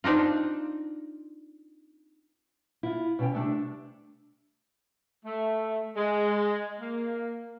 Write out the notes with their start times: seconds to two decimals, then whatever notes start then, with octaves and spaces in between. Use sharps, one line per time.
0.04 C4 D4 D#4 F4
2.83 E4 F4
3.19 B2 C#4 G5
3.32 C3 G3 A3 D4
5.25 A3
5.96 G#3
6.80 A#3